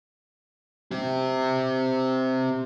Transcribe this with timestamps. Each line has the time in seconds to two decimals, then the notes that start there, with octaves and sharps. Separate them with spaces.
0.91 C4 G4